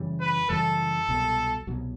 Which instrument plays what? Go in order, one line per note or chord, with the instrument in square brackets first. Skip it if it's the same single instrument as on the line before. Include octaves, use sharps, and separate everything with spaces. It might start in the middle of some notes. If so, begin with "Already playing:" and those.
Already playing: [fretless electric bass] F#2 C#3 E3 G3
[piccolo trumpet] B4
[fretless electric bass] F#2 C#3 E3 G3 [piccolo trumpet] A4
[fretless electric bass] C2 B2 F#3
C2 B2 F#3